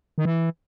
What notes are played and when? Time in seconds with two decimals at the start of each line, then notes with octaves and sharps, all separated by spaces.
0.18 D#3
0.25 E3